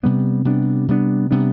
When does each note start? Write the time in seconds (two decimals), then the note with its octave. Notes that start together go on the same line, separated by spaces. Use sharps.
0.03 C3 G3 B3 D4
0.45 C3 G3 B3 D4
0.88 C3 G3 B3 D4
1.31 C3 G3 B3 D4